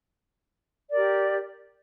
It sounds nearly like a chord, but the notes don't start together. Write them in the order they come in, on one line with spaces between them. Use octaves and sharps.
D5 A#4 G4